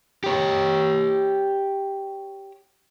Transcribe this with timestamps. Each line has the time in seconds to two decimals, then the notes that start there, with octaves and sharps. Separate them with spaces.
0.24 G4 C#5